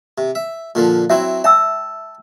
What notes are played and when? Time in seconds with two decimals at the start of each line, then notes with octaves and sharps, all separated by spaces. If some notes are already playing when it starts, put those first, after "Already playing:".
0.18 C3
0.35 E5
0.75 A#2 D3 F3
1.10 F#3 C4 E4 E5
1.44 E5 G5 A5 E6